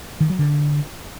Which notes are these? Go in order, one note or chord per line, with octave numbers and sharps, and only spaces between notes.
D#3
F#3
D3